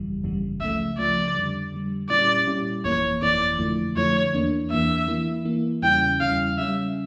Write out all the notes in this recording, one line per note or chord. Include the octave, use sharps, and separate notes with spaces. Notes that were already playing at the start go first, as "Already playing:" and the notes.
Already playing: G1 F2 C#3 E3 G3
G1 F2 C#3 E3 G3
C#2 C#3 F3 A3 E5
C#2 C#3 F3 A3 D5
F2 D3 G3
F2 D3 G3
A#2 G3 C#4 E4 G4 D5
A#2 G3 C#4 E4 G4
G1 F2 E3 A#3 E4 C#5
G1 F2 E3 A#3 E4 D5
F2 D3 F3 A3 E4
F2 D3 F3 A3 E4 C#5
E2 E3 A#3 D4
E2 E3 A#3 D4 E5
E3 A#3 E4
E3 A#3 E4
E2 C#3 G3 C#4 E4 G5
E2 C#3 G3 C#4 E4 F5
C#3 G3 C#4 E5